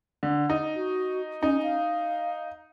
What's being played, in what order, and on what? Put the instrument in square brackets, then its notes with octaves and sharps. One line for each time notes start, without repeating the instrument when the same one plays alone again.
[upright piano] D3
D#4
[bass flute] F#4
[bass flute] C#4 [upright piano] D#4
[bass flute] F5